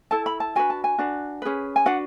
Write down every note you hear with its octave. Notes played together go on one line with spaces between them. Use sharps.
E4 A4 A5
B5
A5
D4 F#4 B4 G#5
A5
G#5
D4 F#4 B4
C#4 G#4 B4
G#5
D4 F#4 B4 F#5